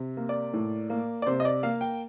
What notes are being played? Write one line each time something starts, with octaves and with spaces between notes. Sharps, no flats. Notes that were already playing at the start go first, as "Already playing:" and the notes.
Already playing: C3
A#3
D5
A2
A#3
D5
C3 C5
D#5
D5
A#3 F5
G5